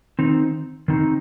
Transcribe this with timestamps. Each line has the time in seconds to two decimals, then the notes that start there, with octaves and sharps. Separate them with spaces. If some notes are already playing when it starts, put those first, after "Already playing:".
0.19 D#3 C4 D#4
0.88 D#3 C4 D#4